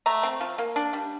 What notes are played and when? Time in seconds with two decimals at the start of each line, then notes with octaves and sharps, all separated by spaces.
0.06 A3 A#5
0.23 C4
0.40 F3
0.58 A#3
0.76 D4
0.93 G3